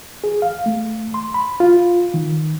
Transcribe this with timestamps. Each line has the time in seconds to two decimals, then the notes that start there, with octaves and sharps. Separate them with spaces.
0.24 G#4
0.42 F5
0.66 A3
1.14 C6
1.34 B5
1.60 F4
2.14 D#3